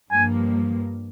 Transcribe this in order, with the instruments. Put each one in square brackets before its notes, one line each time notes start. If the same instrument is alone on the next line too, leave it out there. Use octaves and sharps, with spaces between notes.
[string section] G2 F3 A#3 [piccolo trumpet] G#5